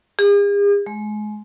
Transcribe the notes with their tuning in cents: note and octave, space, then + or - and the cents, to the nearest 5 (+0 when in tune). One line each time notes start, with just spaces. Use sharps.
G#4 -45
G#3 +30